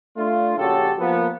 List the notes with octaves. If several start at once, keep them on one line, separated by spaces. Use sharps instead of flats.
A3 D4 F4
A#1 C#3 C#4 F#4 G4 A4
F3 A#3 B3